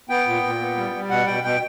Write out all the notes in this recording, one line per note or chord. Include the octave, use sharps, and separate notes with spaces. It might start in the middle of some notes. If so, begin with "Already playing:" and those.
B3 G5
A#2
A#2
B3
G3
G3
B2 F#5
B2 G5
B2 G5